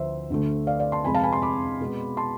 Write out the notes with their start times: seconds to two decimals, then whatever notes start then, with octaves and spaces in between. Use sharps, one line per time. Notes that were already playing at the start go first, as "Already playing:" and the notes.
Already playing: D2 D3 F3 C5 E5
0.30 D2 D3 A3
0.67 D5 F5
0.79 D5 F5
0.92 A5 C6
1.04 F2 C3 G#3 G#5 B5
1.14 F5 A5
1.23 G#5 B5
1.33 A5 C6
1.42 B5 D6
1.81 B2 G#3 B3
2.17 A5 C6